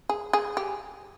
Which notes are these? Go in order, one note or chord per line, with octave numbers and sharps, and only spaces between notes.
G#4
G#4
G4